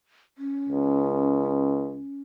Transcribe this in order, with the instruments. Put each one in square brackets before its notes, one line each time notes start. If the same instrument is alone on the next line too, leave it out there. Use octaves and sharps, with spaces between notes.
[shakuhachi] C#4
[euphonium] C#2